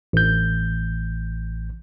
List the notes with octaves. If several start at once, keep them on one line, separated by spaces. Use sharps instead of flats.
A1 G6